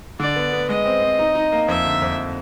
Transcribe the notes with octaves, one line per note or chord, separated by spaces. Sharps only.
D3 D5
B3
B3
G#3 D#5
C4
C4
D#4
D#4
A#3
F2 E5
D3
F2